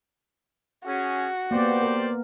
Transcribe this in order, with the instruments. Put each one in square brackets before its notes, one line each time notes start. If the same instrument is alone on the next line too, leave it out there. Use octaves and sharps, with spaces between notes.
[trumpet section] C#4 G#4 [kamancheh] F#4
[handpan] A#3 B3 [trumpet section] G4 C5 D5
[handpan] A#4